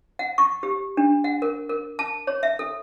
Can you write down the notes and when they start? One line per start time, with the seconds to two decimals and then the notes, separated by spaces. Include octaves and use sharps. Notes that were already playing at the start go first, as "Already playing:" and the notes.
0.19 F#5
0.38 C#6
0.63 G4
0.97 D4
1.24 F#5
1.42 A#4
1.69 A#4
1.99 A5
2.27 C#5
2.43 E5
2.59 A4